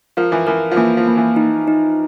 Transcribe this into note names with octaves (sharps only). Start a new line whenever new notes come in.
F3 A#4
E3
E3 A#4
F3
E3 A#3
F3
A#3
E3
D#4
D#4